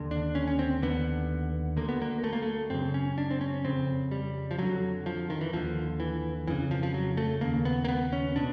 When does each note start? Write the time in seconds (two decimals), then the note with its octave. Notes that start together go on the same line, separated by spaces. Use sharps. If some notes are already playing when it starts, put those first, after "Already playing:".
Already playing: D#2 D3
0.11 D4
0.35 C#4
0.47 C#4
0.59 C4
0.82 D#2 D3 B3
1.77 D2 D3 A#3
1.89 B3
2.02 A#3
2.24 A3
2.33 A#3
2.42 A3
2.70 F#2 C#3 C4
2.94 C#4
3.18 D4
3.31 C4
3.41 C#4
3.65 F2 C#3 C4
4.11 G3
4.51 F3
4.59 F2 D3 F#3
5.06 F3
5.30 D#3
5.41 E3
5.53 D#2 D3 F3
6.00 E3
6.48 F2 C#3 E3
6.71 F3
6.83 F3
6.94 F#3
7.17 A3
7.41 D#2 C#3 A#3
7.65 B3
7.84 A#3
7.88 B3
8.13 C#4
8.36 B2 D4